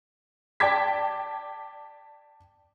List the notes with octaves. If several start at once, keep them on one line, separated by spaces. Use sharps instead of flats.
D5 G5 A5 D6 G#6 B6